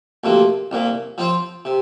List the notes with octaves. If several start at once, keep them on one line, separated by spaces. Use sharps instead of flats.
D2 C3 F3 A#3
C2 A#2 A#3
F3 C4 F4 C5
C3